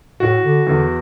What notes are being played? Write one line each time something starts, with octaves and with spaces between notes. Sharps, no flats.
A2 F#4
D3
E2 D3